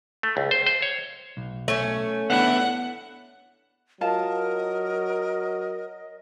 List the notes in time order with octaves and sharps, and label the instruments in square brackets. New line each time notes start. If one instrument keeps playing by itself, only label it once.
[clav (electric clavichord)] A3
C#2
C5
C5
C#5
[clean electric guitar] B1
[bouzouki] A3 C#4
[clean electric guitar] B3 D4 E4 [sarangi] F#5
[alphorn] F#3 [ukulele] F4 A5 [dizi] A#4 [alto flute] D#5